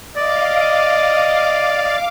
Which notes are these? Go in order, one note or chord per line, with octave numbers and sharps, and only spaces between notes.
D5 D#5 F5 D6